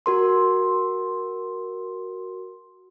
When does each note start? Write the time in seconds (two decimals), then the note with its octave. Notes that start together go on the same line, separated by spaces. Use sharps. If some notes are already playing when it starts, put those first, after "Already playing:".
0.06 F#4 A#4 C6